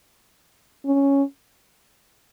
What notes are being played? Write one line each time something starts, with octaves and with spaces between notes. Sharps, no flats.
C#4